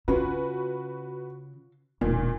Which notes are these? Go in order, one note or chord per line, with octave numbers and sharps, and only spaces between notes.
C#3 C#4 F4 F#4 B4
E1 A#2 D#3